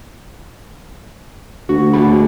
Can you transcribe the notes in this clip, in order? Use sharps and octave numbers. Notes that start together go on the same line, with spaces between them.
D2 F#4 F#5
A3 G#4 B5